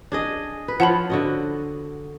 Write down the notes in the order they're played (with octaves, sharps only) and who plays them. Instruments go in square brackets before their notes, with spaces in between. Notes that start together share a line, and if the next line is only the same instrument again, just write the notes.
[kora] D4 G#4 D#5
B4
[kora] F3 F4 C#5 [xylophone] F#5 A5 B5
[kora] D3 F#4 D#5